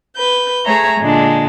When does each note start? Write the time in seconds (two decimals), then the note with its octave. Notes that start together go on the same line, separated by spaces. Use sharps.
0.16 B4 G6
0.65 A3 G#4 C#5 E5 A#5
1.00 A#2 D3 G#3 D4